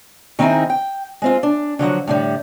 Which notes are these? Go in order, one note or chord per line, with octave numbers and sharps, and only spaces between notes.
D#3 C4 D#4 E4 G#4 A#4
G5
G#3 C4 F4
D4
D3 F3 F#3 F#4
A2 D3 G3